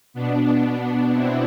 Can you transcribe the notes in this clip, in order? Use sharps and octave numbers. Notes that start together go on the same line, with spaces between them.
B2 B3 D4
C4 E4